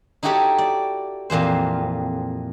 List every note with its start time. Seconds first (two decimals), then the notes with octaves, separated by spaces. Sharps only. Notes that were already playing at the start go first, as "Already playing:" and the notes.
0.23 D#4 E4 F#4 G4 A4 C#5
0.58 D5
1.30 F2 A#2 E3 C5